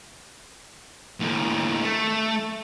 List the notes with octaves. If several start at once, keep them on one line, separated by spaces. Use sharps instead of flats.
D#2 A2
A3